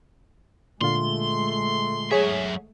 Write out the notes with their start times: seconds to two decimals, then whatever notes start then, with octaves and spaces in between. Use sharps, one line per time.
0.81 A#2 D3 G#3 A3 F4 C6
2.11 F#3 G#4 C#5 E5